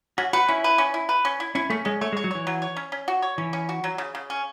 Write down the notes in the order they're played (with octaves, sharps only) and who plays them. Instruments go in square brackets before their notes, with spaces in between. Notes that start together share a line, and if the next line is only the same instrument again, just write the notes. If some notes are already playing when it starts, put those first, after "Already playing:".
[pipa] C#4 [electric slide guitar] F#4
[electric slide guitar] F#4 [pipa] B4
[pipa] C#4 [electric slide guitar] E4
[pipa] B4
C#4
E4
B4
C#4
E4
[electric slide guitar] C#4 [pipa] E4
[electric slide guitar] A3 [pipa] C#4
[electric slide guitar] G#3 [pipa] C#4
[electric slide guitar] A3 [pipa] C#5
[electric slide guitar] G#3
[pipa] C#5
[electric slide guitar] F#3
[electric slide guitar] E3 [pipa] C#5
[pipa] F#3
C#5
C#4
C#4
F#4
C#5
[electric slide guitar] E3 [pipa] C#4
[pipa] C#4
F#4
F#3
C#3
C#3
C#4